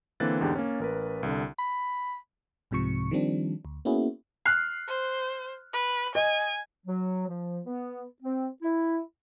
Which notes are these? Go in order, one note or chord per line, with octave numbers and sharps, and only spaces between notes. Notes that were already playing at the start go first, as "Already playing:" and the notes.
D3 E3 A#3 C4 F#6 A6
E2 G#2 D3 G4 G5
A#3 C#4
A1 A#4 B4
C2 D3
B5
C2 G#2 C3 F3 C#6 C#7
D#3 F3 G3 C4 D4
D2
A#3 B3 C#4 E4 F#4 G#4
F6 F#6 C7
C5
B4
D#5 G#5
F#3
F3
B3
C4
E4